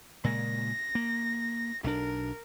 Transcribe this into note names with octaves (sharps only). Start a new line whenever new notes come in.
A#2 C#3 G#3 A#6
A#3
B1 D4 A#4